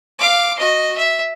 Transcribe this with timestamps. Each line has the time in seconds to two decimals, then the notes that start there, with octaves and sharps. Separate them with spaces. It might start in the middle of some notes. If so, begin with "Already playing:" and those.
0.19 F5 D6
0.58 F#4 D#5
0.97 E5